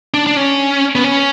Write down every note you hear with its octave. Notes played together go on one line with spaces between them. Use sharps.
D4
D4
C#4
B3
C#4